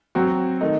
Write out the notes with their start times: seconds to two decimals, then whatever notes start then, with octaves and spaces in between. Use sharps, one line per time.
0.15 F#3 C4 F#4
0.61 D#3 A3 D#4